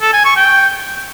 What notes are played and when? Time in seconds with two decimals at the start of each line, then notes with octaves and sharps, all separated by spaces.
0.02 A4
0.13 G#5
0.25 C#6
0.37 G5